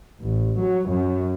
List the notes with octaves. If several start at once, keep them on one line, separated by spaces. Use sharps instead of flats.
A1
F#3
F#2